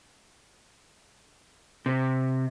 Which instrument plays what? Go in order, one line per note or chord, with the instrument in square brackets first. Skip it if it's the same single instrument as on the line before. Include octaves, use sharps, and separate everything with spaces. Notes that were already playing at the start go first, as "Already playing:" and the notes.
[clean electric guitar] C3